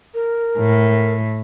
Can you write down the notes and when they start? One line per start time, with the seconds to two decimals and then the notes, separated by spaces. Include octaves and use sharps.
0.14 A#4
0.58 A2